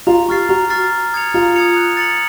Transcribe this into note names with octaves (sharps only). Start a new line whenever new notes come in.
F4 A#5
G4 C#6 F6 A6 C7
F#4 A#5
C#6 F6 A6 C7
A#5
D#6 G#6 C#7 F7
F4 A#5
D#6 G#6 C#7 F7
F#6
A6 C#7 F#7